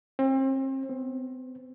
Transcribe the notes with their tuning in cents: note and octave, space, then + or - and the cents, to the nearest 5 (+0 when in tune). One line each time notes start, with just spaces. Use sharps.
C4 +35
C4 -45